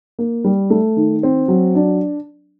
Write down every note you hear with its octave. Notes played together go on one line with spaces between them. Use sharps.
A#3
G3
A3
D#3
C4
F#3
D4